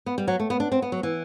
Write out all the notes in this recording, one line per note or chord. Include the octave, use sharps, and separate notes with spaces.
B3
G3
F#3
A3
B3
D4
C4
B3
F#3
E3